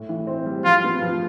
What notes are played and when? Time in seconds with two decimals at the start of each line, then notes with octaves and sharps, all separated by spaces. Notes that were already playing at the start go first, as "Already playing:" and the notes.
Already playing: A2
0.09 E3
0.27 C4
0.46 G3
0.64 F3 F4
0.84 B3
1.02 F3